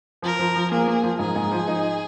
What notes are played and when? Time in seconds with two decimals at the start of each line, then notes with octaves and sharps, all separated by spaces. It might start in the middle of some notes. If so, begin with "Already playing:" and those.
0.22 F3 A#4
0.39 F3
0.55 F3
0.71 A#3 G#4
0.88 A#3
1.03 F3
1.19 G#2 G#4
1.36 G#2
1.52 F3
1.68 D#4